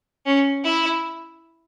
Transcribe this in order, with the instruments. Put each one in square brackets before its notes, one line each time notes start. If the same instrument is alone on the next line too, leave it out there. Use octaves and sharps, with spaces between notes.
[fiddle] C#4
E4